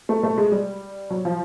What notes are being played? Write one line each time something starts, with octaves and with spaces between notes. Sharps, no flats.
A3
A3
G#3
G3
F#3
F3